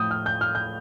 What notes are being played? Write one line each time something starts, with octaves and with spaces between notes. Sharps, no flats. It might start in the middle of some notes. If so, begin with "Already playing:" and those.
Already playing: A2 F3 D#6 G6
F6
G6
F6
G6